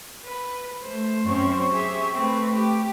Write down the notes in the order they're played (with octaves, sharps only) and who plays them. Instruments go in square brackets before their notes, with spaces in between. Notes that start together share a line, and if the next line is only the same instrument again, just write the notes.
[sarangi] B4
[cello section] A3 [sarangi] C5
[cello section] F#2 C4 C#4 [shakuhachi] C#6
[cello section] G4 G#4 E5
[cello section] A3 B4 [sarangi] C4
[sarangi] G4